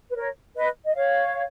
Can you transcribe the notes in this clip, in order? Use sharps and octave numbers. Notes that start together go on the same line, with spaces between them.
B4
A#4 C#5
B4 D#5
D#5
C#5 F5